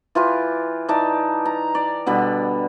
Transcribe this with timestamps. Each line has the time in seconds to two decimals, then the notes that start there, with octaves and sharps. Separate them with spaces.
0.15 E3 F4 G4 B4
0.88 E3 D#4 D5 A5
1.45 A#5
1.75 D5
2.06 B2 D3 G3 B5